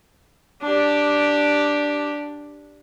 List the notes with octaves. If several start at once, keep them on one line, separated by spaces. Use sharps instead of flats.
D4 G4